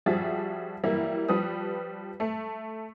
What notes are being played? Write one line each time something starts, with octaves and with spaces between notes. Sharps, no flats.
F3 G3 F#4 G#4 E5 A6
E3 F#3 G3 A#3 E4
F3 G3 B4 D#6
A3